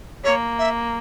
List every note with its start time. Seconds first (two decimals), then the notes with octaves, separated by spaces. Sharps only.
0.24 A#3 C#5
0.59 E5